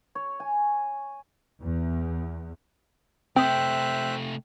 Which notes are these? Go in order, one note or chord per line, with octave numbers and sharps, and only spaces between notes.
C#5
G#5
E2
C3 A3 C4 C5 E5 G5 D#6 F#6